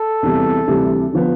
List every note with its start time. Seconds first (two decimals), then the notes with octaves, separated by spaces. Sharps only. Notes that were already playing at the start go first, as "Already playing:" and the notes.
Already playing: A4
0.23 E2 C3 E3 G3
0.68 D2 C3 E3 G3 D4
1.12 D3 F3 B3